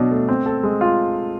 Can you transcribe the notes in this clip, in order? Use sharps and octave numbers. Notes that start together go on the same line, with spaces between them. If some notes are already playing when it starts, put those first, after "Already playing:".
Already playing: B2 F#3 D4
A3
C4
A4
G#3
F4